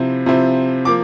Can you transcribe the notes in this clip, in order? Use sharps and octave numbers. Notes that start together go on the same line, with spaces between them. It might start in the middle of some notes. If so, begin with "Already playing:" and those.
Already playing: C3 F3 C4 E4
C3 F3 C4 E4
F3 A#3 D6